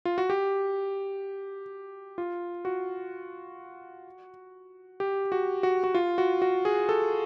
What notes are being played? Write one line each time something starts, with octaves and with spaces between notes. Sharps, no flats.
F4
F#4
G4
F4
F#4
G4
F#4
F#4
F#4
F4
F#4
F#4
G#4
A4